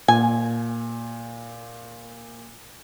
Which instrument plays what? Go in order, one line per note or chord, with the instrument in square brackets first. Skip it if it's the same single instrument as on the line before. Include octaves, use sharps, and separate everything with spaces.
[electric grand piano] A#2 [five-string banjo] G#5